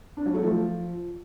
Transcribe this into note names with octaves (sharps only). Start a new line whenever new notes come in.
D4
F#3
A3
F3